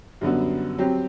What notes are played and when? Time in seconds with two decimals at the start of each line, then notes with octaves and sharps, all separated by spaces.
0.21 F#2 D3 G3 B3 F#4
0.78 F#3 C4 G4